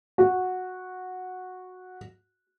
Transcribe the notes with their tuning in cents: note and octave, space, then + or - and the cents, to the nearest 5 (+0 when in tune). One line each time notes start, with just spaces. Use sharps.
F#4 -10